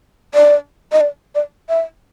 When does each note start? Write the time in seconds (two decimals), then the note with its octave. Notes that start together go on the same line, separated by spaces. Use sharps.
0.34 D5
0.92 D#5
1.01 D5
1.35 D5
1.69 E5